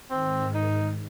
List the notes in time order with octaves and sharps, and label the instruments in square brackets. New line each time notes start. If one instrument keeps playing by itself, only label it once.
[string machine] G#2 D#3 [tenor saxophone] C4
[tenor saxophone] D#4